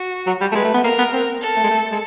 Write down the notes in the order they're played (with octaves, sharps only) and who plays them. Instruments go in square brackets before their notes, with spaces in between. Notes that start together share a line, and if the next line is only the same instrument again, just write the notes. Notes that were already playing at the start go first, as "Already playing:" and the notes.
Already playing: [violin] F#4
[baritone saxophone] F#3
G3
A3
[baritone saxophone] G#3 [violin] B4
[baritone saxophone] A3
B3
[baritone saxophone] A#3 [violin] A#4
[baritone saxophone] B3
C4
[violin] A4
[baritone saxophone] A3
G#3
A3
G#3